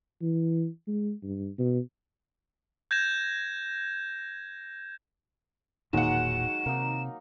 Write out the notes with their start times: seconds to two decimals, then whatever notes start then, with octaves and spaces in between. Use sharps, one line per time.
0.21 E3
0.87 G#3
1.23 G2
1.59 B2
2.91 G6 G#6 A#6 E7
5.93 E1 A#2 D#3 F#3 G#3 A#3 F#5 E7
6.66 C3 A#3 D#4